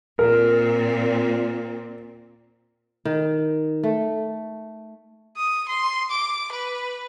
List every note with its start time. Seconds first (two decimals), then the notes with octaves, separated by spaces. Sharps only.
0.19 A#2 C4 A#4
3.05 D#3
3.83 A3
5.36 D#6
5.68 C6
6.10 D6
6.52 B4